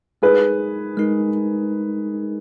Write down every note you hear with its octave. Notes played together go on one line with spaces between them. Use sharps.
G#3 D#4 G#4 A#4 B4
G#3 D#4 A#4